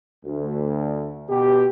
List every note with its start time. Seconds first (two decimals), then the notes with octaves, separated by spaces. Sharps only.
0.24 D2
1.29 B2 G4